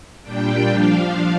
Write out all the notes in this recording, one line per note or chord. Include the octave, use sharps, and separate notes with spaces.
A#2 G3 D4 G5
F3 D4 F5